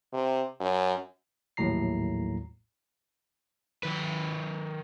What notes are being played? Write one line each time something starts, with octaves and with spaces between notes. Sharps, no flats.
C3
F#2
A#1 D#2 A2 F#3 A#5 C7
D#3 B4